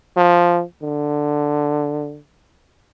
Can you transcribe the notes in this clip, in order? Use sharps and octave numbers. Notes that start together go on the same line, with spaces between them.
F3
D3